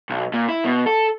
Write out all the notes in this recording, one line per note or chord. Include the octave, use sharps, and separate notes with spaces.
B1
A#2
E4
B2
A4